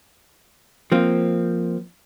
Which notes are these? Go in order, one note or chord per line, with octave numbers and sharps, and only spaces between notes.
F3 A#3 C4